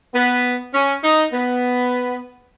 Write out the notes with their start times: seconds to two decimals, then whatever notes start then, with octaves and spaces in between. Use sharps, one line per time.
0.13 B3
0.73 C#4
1.03 D#4
1.32 B3